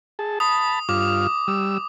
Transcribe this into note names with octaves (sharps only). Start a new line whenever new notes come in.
G#4 A5
A5 B5 D#6
G2 F4 D6 F6
G3 E6